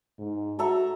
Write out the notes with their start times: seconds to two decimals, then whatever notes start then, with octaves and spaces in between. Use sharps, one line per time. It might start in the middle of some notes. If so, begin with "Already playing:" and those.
0.19 G#2
0.59 F#4 A4 E5 A#5